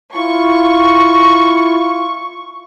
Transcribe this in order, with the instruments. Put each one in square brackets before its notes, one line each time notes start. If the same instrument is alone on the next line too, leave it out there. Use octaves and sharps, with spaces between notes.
[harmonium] E4 F4 [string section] C#6